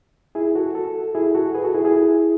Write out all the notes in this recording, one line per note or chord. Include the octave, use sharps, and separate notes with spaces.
E4 G#4
F#4 A4
F#4 A4
E4 G#4
F#4 A4
G#4 B4
F#4 A4
E4 G#4
E4 G#4